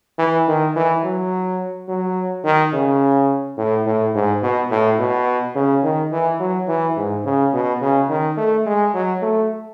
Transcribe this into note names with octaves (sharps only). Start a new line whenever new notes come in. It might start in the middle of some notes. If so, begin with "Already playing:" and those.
E3
D#3
E3
F#3
F#3
D#3
C#3
A2
A2
G#2
B2
A2
B2
C#3
D#3
E3
F#3
E3
G#2
C#3
B2
C#3
D#3
A3
G#3
F#3
A3